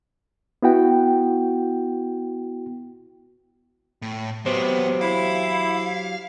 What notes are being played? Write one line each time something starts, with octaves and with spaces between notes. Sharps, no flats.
B3 E4 F#4 G5
A2
F#3 B3 G4 C5
E4 F5